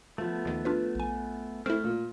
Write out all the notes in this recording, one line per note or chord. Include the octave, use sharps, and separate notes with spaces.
F3 A3 B3
D#2 D#3
D4 F4 B4
A#1 G#5
A3 C4 E4 F6
A#2